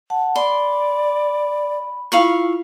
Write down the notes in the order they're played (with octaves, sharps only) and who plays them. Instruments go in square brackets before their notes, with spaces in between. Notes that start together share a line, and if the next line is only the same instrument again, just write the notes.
[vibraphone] F#5 A5
[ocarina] D5 [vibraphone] B5 [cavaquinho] C6
[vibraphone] E4 F4 [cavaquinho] F5 B5 C#6